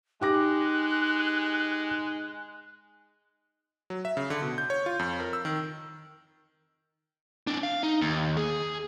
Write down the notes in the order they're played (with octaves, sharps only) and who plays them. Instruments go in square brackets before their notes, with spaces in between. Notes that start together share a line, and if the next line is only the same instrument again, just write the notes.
[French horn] G#3 [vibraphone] D#4 [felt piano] G4 D6 A#6 [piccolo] F#6
[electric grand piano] F#3
E5
C#3
D3
B2
G6
C#5
F4
F2
A#4
E6
D#3
[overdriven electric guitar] C4 D4
F5
D#4
D#2
G#4